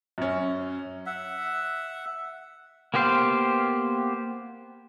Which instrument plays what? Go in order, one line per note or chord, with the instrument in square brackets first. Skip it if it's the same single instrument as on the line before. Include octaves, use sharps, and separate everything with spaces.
[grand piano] F#2 C#4
[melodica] E5 F#5
[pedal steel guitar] A#3 B3 G4 C5 F5